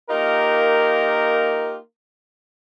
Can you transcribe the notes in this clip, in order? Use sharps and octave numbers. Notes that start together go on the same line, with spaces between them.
A#3 D#4 F4 G4 A#4